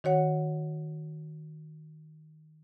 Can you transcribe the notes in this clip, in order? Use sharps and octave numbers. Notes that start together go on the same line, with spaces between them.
D#3 F#4 C#5 F#5